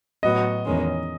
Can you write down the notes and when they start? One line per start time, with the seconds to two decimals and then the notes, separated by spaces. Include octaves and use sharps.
0.23 A2 F#3 B3 F#4 D#5
0.65 E2 D#3 G#3 C#4